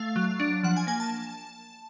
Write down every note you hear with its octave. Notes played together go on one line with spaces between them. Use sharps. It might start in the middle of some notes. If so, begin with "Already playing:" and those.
Already playing: A3 F5
F#3
D4
F3 F#5
G#5
A#3 G#5
A5